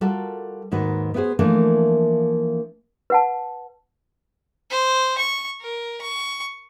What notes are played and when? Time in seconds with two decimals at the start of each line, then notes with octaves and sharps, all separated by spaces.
0.01 G3 F4 F#4 A4 A#4
0.71 D#2 G#2 D#3 F#4 B4
1.14 B3 E4 F#4 G#4 C5
1.39 E3 F3 A3 A#3 D4
3.10 B4 F#5 A5
4.71 C5
5.18 C#6
5.61 A#4
6.02 C#6